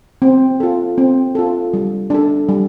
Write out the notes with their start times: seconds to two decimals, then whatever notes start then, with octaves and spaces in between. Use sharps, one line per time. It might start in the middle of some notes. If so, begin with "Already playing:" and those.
0.22 C4
0.60 F4 A4
0.98 C4
1.35 F4 A4
1.74 G3
2.10 D4 A4
2.49 G3